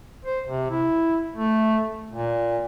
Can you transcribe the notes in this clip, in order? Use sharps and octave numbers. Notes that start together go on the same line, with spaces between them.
C5
C3
E4
A3
A#2